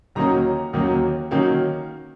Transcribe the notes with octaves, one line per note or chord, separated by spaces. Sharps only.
D#2 D#3 F#3 A#3 C#4 A#5
D#2 D#3 F#3 A#3 C#4
D#3 F#3 A#3 C#4